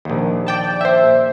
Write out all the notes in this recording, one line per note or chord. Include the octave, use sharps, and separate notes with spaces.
A#1 D#2
D5 G5 A5
C5 E5